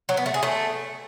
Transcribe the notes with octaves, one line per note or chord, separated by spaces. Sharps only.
F#3
B3
A3
G#4
A3